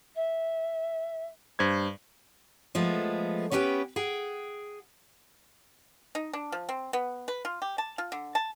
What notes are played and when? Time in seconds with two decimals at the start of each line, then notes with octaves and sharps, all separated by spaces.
0.15 E5
1.59 G2 C5 G#6
2.75 F3 G#3 A3 B3
3.51 B3 C#4 G4 B4 G5
3.96 G#4 F#5 G5
6.15 D#4
6.33 D4
6.52 F3
6.69 C4
6.93 B3
7.28 B4
7.45 F4
7.62 G4
7.78 A5
7.98 F4
8.12 D3
8.35 A5